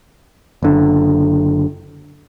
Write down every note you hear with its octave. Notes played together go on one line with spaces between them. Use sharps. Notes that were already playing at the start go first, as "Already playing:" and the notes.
F#1 D3